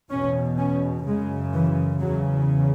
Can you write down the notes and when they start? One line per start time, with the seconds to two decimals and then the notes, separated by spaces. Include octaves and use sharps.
0.10 E2 B2 C#4
0.58 C#4
1.06 F#2 C#3 G#3
1.53 E3
2.01 E2 C#3 F#3